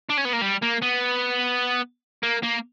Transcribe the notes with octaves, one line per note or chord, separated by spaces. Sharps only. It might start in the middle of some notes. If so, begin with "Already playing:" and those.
D4
C#4
B3
A#3
G3
A#3
B3
A#3
A#3